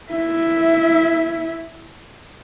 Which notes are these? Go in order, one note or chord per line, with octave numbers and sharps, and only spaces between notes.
E4 E5